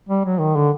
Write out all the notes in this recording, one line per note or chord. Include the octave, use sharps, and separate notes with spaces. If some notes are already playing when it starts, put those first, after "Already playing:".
G3
F#3
D#3
D3